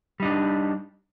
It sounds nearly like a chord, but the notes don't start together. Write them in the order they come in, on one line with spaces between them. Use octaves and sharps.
G3 D#4 D4